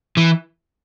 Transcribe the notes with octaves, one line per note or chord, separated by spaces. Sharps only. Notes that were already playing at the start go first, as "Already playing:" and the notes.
E3